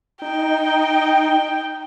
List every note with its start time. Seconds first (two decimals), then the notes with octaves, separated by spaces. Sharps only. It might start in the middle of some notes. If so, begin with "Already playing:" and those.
0.22 D#4 G5